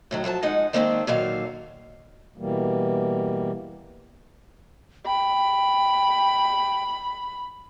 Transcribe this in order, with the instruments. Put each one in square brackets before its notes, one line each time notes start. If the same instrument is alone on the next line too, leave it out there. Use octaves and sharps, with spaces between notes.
[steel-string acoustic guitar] A2 D#3 F#3
F3 F#3 G#5 A5
F2 G#3 D#4 F#5
D#3 E3 G#3 A#3 C4 D4
A#2 D3 D#3 F#3 F5
[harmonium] B2 E3 G3 A#3
[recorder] G5 [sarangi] B5